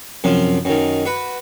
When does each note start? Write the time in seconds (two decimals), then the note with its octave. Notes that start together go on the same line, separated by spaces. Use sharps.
0.24 F#2 C3 F3
0.65 F#2 D#3
1.06 F#4 B4